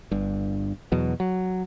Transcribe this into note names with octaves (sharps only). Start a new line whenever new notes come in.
G1 G2
E2 B2 F#3
F#3